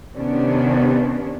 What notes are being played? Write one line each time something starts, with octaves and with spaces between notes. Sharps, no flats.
C3 D#3 B3 C#4 D4